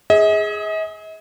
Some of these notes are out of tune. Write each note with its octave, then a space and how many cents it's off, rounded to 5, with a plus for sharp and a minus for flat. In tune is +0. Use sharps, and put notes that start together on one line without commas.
G#4 +0 D#5 +45